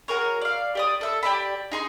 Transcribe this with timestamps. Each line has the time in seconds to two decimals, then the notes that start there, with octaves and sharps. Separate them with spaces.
0.08 F#4 G#4 A#4 C#5
0.41 D5 F5
0.75 G4 D5 D#6
1.01 A4 E5 E6
1.23 G4 D5 A5 B5
1.71 D#4 G#4 C6